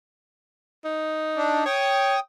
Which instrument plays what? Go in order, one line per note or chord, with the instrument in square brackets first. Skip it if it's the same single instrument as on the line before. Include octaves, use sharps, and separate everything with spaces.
[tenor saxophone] D#4
[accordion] D4
[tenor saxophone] C#5 [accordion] G5 D#6